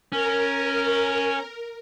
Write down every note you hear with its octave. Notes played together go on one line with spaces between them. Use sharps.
C#4 A#4